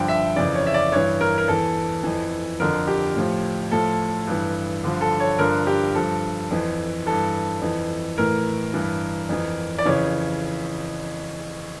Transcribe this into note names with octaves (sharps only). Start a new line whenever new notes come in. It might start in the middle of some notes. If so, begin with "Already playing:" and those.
Already playing: G2 D3 F3 G5
E5
F2 C#3 E3 D5
C#5
E5
D5
G2 E3 C#5
A#4
A#4
E2 E3 A4
F2 E3
F2 D3 F3 A#4
G4
A2 F3
A2 F3 A4
G2 E3
G2 D3 F3
A4
C#5
G2 D3 F3 A#4
G4
G2 F3 A4
F2 E3
G2 E3 A4
F2 E3
A2 E3 A#4
G2 E3
F2 E3
D5
F2 C#3 E3 C#5